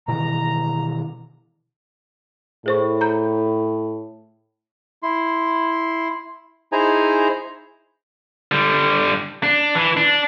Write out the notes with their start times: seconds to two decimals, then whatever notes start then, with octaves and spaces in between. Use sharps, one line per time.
0.08 B2 D#3 E3 A#5
2.66 A2 G#4 C5 C#6
3.01 A#5 G6
5.03 E4 C6
6.72 D#4 E4 G#4 C5 G#5 A#5
8.52 D3 G3
9.43 D4
9.75 E3
9.97 D4